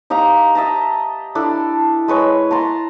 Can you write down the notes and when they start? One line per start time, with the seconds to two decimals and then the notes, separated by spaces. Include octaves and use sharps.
0.10 D#4 G4 F5 A#5
0.55 D#5 E5 A5 A#5
1.35 D4 E4 A4
2.08 G#3 B4 C#5
2.51 A5 A#5 C6